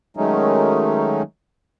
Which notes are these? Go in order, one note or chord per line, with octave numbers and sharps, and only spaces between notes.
D#3 F#3 G#3 A3 C#4 D#4